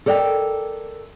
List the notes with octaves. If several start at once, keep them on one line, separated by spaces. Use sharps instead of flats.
A4 A#4 D5 D#5 G5